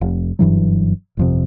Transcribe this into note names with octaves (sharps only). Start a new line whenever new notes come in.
F1
F#1 G2 E3 F#3
G1 F2 C3